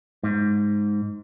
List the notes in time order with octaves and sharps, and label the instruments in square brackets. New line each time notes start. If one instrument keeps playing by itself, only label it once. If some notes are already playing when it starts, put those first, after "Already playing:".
[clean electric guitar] G#2